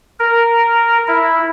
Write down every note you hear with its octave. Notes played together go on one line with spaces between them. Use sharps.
A#4
E4